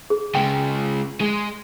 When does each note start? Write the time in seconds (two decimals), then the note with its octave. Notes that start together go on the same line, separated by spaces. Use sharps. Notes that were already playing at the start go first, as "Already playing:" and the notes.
0.10 G#4
0.35 C#3 G#3 G5
1.21 G#3